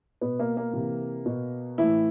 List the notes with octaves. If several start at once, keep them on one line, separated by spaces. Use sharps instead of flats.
B2 B3
A#3
A#3
C3 E3
B2
A2 E3 E4